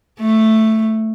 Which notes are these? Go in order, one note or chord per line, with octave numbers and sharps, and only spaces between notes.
A3